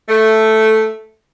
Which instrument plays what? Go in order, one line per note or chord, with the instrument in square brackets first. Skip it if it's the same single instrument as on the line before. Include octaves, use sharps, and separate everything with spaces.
[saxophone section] A3